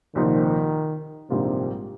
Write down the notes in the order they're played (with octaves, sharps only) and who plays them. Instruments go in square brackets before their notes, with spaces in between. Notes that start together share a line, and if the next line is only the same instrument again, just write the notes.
[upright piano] C2 A#2 F3 C4 D#4 [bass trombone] D#3
[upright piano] A#1 G#2 G3 A#3 F4 [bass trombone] C3